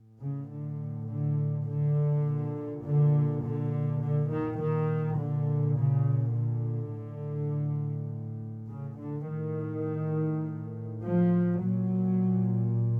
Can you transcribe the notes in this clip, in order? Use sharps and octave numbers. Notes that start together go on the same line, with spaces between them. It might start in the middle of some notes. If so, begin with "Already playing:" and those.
Already playing: A2
C#3
D3
D3
D3
A#2
D3
D3
D3
D#3
A#2 D#3
D3
C#3
D3
A2
C#3
D3
A2 D#3
F3
A#2 F#3